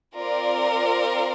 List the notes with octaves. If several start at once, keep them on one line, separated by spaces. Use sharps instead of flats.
C4 F4 A#4 D5